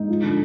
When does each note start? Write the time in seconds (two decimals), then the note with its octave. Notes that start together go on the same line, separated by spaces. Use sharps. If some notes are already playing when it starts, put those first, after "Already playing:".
Already playing: G#2 D#4
0.09 F3
0.23 D3